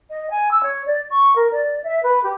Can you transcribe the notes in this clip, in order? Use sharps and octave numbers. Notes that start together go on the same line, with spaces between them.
D#5
G#5
E6
C#5
D5
C#6
A#4
D5
E5
B4
G4